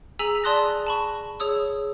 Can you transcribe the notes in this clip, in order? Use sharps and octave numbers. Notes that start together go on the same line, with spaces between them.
G#4 G#5 A#5 E6 B6 F#7
D5 A5 C6 D#6 F#6 A#6
A5 B5 C#6
G#4 C#5 D#6 E6